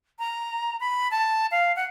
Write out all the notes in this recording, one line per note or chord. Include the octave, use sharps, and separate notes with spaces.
A#5
B5
A5
F5
F#5